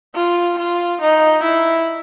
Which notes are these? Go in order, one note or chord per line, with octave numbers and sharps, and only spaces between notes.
F4
F4
D#4
E4